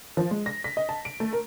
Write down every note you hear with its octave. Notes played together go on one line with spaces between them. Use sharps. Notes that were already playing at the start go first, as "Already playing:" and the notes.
F3
G#3
A#6
B6
D#5
A5
D7
A3
A#4